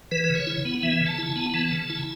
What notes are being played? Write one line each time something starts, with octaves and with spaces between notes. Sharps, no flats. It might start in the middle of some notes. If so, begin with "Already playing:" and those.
E3 B4
B4
C#3
C#5
E4
B3
E3 E5
C#3
A5
E4
A5
B3
E3 A5
C#3
E4